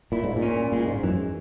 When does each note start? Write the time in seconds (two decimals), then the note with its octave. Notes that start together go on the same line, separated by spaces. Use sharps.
0.12 A#2 E4
0.24 G#2
0.36 A#2
0.42 C#4
0.72 A#2 G#3
0.88 G#2
1.03 F#2 E3